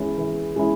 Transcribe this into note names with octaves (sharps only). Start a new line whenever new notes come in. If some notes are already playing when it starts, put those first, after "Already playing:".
Already playing: E3 G#3 C#4 E4
E3
G#3 C#4 E4